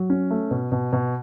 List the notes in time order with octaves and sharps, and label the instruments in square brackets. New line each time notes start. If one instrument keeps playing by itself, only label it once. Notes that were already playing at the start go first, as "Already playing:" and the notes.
Already playing: [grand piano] F#3
C#4
A3
B2
B2
B2